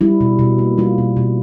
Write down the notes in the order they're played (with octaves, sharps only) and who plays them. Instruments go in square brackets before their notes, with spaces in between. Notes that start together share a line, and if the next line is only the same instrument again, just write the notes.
[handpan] G3 E4
B2
B2
A#3
G3 F4
B2
B2